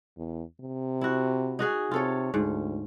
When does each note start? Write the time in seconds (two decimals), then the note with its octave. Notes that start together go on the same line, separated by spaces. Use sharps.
0.17 E2
0.60 C3
1.01 E4 F#4
1.59 D#4 F#4 G#4
1.91 C3 F4 A4 C#5
2.34 D2 G#2